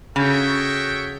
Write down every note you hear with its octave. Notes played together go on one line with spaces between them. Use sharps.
C#3 F#4 A4 C#5 E5 G5